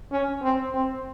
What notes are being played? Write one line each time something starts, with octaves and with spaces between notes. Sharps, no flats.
C#4
C4
C4